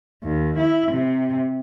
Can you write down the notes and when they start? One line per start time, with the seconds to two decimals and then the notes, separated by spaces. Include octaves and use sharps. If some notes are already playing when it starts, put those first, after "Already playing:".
0.23 D#2
0.59 E4
0.92 C3